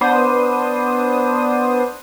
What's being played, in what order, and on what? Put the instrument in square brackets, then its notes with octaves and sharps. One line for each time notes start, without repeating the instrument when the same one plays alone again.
[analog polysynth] B3 D4 C5 D#6